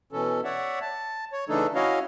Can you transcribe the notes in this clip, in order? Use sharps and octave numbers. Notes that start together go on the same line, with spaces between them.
B2 E3 C#4 A4
C#5 D5 E5 F#5
A5
C#5
C#3 E3 A3 D4 D#4 A4
C#4 E4 F#4 C#5 D#5 F5